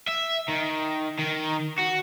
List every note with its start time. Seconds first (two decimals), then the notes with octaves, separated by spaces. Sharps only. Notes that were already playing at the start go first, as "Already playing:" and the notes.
0.08 E5
0.49 D#3
1.19 D#3
1.79 F#4